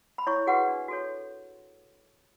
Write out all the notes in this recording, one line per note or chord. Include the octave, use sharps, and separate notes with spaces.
B5
E4 C#5 C#6
F#4 G#4 B4 F#5
D4
F#4 A4 C#5